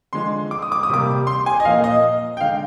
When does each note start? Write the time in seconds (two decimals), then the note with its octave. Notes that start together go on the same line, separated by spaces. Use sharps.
0.13 D3 F3 G#3 C6
0.51 D6
0.62 D#6
0.72 D6
0.83 D#6
0.90 C3 G3 A#3 D6
1.27 C6
1.46 G#5
1.60 D#5
1.65 A#2 F3 A#3 F5
1.84 D#5
2.37 G5
2.40 D3 G#3 F5